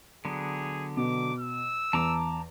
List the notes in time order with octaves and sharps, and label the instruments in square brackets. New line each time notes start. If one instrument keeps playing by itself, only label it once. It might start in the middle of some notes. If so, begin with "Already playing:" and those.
[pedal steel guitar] D3 F#3 B3 [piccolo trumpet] G#4
[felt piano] B2 [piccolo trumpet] D6
[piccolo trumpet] E6
[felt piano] E2 [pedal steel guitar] A5 A#5 D6